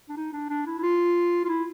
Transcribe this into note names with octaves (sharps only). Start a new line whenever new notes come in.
D4
D#4
D4
D4
E4
E4
F4
F4
E4